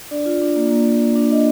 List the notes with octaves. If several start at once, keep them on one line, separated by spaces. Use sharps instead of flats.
D4 D5
F4
D4
A#3
A#3
A#3
A#3
D4
D4 D#5